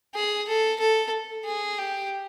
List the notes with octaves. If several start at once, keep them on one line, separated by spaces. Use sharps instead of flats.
G#4
A4
A4
G#4
G4